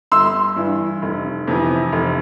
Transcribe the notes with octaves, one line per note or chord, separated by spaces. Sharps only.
G1 C6 E6
G2 E3
F1
F2 C3 E3
F1